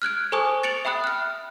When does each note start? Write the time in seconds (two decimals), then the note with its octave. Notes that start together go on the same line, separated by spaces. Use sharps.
0.02 F6 F#6 G#6 D7
0.32 A4 C5 G#5 A5 C#6 D#6
0.63 A6 C#7 D7 F7 F#7
0.85 E5 G5 B5 D#6 F#6
1.04 F6 F#6